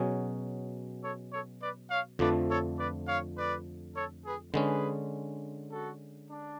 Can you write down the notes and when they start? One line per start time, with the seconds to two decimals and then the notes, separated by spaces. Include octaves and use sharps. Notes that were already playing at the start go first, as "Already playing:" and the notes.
Already playing: B2 F#3 C#4 G#4
1.01 A4 C#5
1.31 A4 C#5
1.60 B4 D5
1.89 C#5 F5
2.19 F2 D3 F3 A3 B4 D5
2.48 A4 C#5
2.78 B4 D5
3.07 C#5 F5
3.36 B4 D5
3.95 A4 C#5
4.24 G#4 B4
4.53 D3 G#3 C#4 G#4 B4
5.70 F#4 A4
6.29 D4